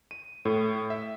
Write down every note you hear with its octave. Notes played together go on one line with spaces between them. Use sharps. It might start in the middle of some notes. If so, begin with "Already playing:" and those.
D#7
A2
E5